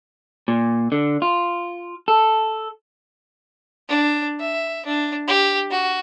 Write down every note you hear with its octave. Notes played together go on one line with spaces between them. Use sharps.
A#2
D3
F4
A4
D4
E5
D4
G4
F#4